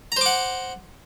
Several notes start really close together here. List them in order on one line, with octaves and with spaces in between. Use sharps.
A#5 C5 D6 F#5